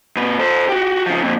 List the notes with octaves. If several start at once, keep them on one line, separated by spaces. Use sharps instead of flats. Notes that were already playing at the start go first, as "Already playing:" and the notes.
A#2 B4
A4 C5
F#4 G4
C#3 F3
F2 A#2